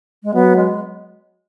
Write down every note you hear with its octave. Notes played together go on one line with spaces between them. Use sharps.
G#3
F#3 B3
G#3